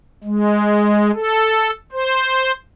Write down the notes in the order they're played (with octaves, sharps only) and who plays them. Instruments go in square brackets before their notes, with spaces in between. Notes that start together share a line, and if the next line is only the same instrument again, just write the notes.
[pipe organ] G#3
A4
C5